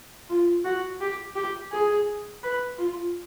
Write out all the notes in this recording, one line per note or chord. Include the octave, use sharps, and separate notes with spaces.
F4
F#4
G4
G4
G#4
B4
F4